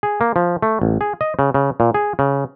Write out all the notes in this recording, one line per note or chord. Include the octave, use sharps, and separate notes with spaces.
G#4
A#3
F3
A3
A1
G#4
D#5
C#3
C#3
A#2
G#4
C#3